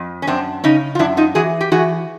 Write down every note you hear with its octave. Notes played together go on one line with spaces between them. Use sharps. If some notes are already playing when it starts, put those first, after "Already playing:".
Already playing: F2
C#4
F#2 C4 D4
C#3 C#4 D#4
F4
F#2 D4 E4
D#4 F4
E3 F#4 G#4
G4
E3 F#4 G#4